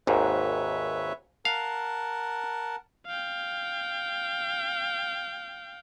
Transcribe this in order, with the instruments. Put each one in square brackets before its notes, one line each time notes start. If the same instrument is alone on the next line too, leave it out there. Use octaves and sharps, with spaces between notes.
[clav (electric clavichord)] G#1 D#2 G#2 [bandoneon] B4 C#5 E5
[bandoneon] A#4 F#5 A5 [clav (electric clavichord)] F5
[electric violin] F5 G5